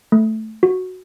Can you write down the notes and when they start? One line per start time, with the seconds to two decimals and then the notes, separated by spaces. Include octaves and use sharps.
0.12 A3
0.63 F#4